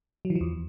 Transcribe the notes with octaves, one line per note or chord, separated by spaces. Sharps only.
F#3
E3
F3
E2